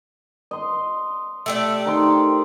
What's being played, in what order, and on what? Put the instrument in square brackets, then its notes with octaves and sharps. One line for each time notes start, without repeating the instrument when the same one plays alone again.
[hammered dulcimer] D#5 C6
[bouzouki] A3 G4 D5
[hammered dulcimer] D#3 C5 C6